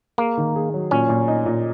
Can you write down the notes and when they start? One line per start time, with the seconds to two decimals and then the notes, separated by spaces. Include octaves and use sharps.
0.18 A#3 G#4
0.37 D#3
0.56 G#4
0.74 F#3
0.91 A#2 C#4
1.09 A#2
1.28 D#4
1.46 A#2